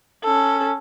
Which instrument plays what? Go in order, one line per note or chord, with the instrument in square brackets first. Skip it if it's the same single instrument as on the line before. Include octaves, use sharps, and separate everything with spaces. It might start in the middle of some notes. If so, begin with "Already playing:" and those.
[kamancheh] C#4 A4